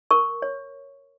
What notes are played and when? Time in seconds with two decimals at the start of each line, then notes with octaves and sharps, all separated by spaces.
0.11 A#4 C#6
0.42 C#5